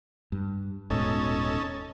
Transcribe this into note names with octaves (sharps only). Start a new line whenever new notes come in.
G2
D#1 G#2 B2 C#4 D#4 A4